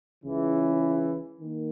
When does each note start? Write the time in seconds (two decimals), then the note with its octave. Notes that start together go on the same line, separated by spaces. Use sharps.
0.24 C#2 C#3 E3
1.41 D#3 A#3